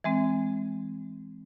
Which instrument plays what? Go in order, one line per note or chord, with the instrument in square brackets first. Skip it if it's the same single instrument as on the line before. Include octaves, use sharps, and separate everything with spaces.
[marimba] E3 G#3 C4